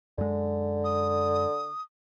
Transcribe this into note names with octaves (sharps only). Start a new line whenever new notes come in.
F#2 D3 G#3
D#6